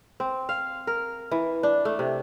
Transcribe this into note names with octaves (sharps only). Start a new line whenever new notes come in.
C4
F5
A#4
E3
D4
A3
C3